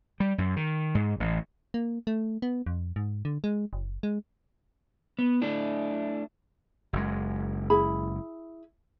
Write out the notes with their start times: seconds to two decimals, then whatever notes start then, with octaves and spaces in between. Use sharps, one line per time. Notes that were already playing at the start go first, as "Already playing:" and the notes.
0.20 G3
0.38 F#2
0.56 D#3
0.95 G#2
1.20 A1
1.74 A#3
2.07 A3
2.42 B3
2.66 F2
2.96 G#2
3.25 D3
3.44 G#3
3.73 F#1
4.03 G#3
5.19 B3
5.42 A3 D4 E4
6.93 F#1 F#2 G#3
7.70 E4 G#4 B5